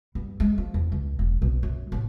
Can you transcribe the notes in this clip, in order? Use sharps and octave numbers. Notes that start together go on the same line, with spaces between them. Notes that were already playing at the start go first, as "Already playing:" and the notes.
G2
G#3
F3
E2
C#2
E1
B1
F#2
A1